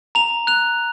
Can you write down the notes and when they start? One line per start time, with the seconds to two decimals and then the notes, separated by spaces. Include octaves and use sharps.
0.15 A#5 F7
0.47 F#6 F7